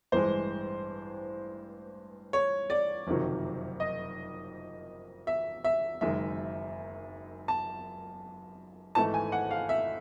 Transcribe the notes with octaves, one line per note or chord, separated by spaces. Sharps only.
A1 G2 E3 G#3 C5
C#5
D5
F#1 F2 C3 D#3 F#3
D#5
E5
E5
F#1 F#2 D#3 G#3 E5
A5
G#1 G#2 E3 A3 A5
G#5
F#5
F5
E5